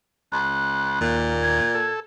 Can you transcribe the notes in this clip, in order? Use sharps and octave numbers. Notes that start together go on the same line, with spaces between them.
C#2 F#6
D#2 A#2
G#6
A4